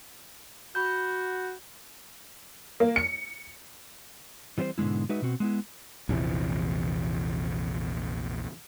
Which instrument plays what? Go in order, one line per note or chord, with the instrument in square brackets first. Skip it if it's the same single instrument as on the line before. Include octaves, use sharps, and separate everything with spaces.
[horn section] F#4 [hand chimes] B5 G6
[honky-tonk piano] A#3
C#7
[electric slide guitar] E3 G3 C4 E4 C5
G#2 B2 D3 G#3 E4
G#3 D#4 F#4 B4 E5
B2 C4 F#4
G#3 B3 E4
[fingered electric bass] A#1 E2 C3 E3